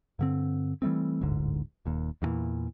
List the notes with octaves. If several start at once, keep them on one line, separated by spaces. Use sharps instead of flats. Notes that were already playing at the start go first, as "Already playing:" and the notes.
G2 D3 C4
E3 G3 A3 C4
D1 G1 G#2 D3
D#1 D#2
E2 G2 A#2 E3